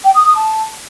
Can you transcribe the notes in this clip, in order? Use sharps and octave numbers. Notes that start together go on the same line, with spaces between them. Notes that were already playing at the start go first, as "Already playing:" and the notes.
G5
D#6
D#6
A5